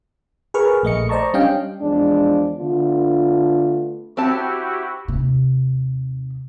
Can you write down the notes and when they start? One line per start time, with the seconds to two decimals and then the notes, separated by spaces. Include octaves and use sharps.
0.54 G#4 A#4 B4 C#6 F6
0.83 A#1 A3 D#5 C#7
1.09 C5 D5 D#5 A5 A#5 C#6
1.34 G3 C#4 D4 D#5 F5 G5
1.81 E2 F3 G#3 D4
2.57 D3 A3 B3 D4 F4
4.17 C4 E4 F#4 G4 A5
5.08 D#2 C3